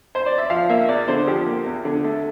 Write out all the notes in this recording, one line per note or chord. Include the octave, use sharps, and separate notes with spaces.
C5
D5
E5
F3 F5
A#3 E5
E2 D5
D3 C5
F3 G4
A#3
E2
D3
A3